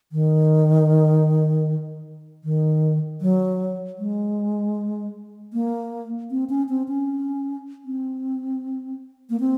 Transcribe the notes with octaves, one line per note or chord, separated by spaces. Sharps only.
D#3
D#3
F#3
G#3
A#3
C4
C#4
C4
C#4
C4
A#3
C4